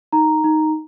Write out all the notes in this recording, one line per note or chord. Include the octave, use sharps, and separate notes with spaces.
D#4 A#5
D#4